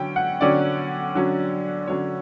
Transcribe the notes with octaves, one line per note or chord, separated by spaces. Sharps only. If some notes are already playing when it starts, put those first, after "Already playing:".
Already playing: D3 F#3 C#4 G5
F#5
D3 F#3 C#4 D5
D3 F#3 C#4
D3 F#3 C#4 C#5